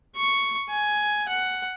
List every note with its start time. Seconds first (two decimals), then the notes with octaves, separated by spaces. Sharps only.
0.16 C#6
0.69 G#5
1.29 F#5